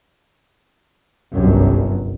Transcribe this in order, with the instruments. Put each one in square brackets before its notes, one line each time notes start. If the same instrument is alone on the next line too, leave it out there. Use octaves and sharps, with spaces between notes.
[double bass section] G1 C2 F#2